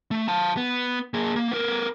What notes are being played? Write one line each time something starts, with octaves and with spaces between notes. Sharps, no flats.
A3
F5 A5
B3
A#3 G#4
A#3
B3 A#4